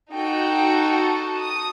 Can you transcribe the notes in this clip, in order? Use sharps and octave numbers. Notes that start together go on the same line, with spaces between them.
D#4 F#4 A4 G5
A5
D#6